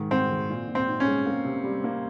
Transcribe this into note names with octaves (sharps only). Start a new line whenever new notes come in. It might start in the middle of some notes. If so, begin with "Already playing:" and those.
Already playing: G#2 D#3
G#2 C4
D#3
A#2
A#2
C4
D#4
C#4
G#3
A#3
C3
G3
A#3